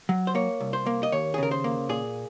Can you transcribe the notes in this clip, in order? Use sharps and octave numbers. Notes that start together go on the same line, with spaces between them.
F#3
C5
A#3 C#5
C2
C5
A#3
D#5
D#2 C#5
G#4
C#3 A#4
C5
A#3
A#2 G#4